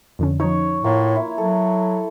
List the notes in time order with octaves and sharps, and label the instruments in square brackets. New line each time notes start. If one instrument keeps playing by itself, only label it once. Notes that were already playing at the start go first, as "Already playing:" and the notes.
[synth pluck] F2 D3 C#4
[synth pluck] F3 D#4 [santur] C#5
[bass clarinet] A2 [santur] A#3 F4
[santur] E4
[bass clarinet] F#3 [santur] A4